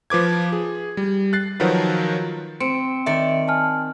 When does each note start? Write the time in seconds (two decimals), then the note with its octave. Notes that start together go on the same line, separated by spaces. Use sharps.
0.10 F3 B4 D6 G#6
0.52 G#4
0.97 G3
1.33 F#6 A6 C7
1.60 D#3 F3 F#3 F#4 A#4 B4
2.60 C4 C6 C#7 D7
3.06 D#3 D5 E5 C#7
3.48 G#5 A5 F6